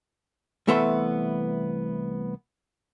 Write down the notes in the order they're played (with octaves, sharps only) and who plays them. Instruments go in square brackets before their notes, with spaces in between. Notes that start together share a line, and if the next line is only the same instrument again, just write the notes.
[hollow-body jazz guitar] C2 E3 A3 B3 E5 C6